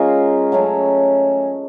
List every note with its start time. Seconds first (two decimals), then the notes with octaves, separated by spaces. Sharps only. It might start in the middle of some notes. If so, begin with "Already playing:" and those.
Already playing: G#3 C#4 F4 A#4
0.52 F#3 A3 C#4